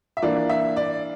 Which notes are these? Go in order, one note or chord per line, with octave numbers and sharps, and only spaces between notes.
E5
E3 A#3 D4 D5
E5
D5